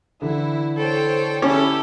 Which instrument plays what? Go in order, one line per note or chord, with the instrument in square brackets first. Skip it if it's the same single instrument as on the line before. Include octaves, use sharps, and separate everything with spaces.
[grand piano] D3 E3 [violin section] E4
[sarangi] A4 [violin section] C5 C#5 G5
[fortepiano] C#4 [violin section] E4 G4 A4